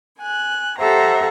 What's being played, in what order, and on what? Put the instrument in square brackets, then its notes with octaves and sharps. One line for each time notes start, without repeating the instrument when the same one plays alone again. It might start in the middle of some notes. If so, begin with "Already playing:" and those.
[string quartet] G#5 F#6
G4 A4 C5 E5 F#5 A#5